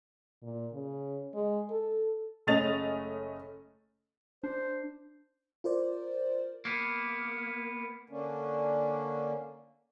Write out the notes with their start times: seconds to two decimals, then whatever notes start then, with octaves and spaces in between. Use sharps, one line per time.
0.43 A#2
0.73 C#3
1.34 G#3
1.70 A4
2.47 F#1 A3 C#4 D#5 A6 F7
4.43 D4 C5
5.64 F4 A#4 C5 D5
6.65 A#3 B3
8.10 D3 A#3 C#4 D4